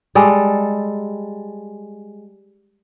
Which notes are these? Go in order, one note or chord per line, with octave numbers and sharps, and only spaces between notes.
G3 G#3 A4